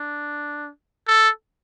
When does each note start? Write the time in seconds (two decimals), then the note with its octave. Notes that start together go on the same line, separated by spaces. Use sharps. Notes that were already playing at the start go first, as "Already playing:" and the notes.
Already playing: D4
1.07 A4